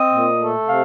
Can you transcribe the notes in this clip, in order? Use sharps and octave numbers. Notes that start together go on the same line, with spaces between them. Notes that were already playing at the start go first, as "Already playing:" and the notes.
Already playing: C4 D#5
A#2
A3
C3 F5